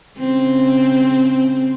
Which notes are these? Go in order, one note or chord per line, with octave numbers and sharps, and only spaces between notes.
C#3 C4